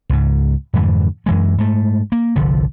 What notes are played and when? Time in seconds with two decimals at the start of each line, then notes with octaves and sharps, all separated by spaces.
0.09 C#2 G#2
0.74 F2 G#2 D3 E3
1.26 F#2 E3 G#3
1.58 G#2 A3
2.12 A#3
2.36 G1 C2 D3 F3